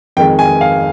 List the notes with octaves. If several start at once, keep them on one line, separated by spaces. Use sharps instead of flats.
F2 D#3 G#3 G5
G#5
F5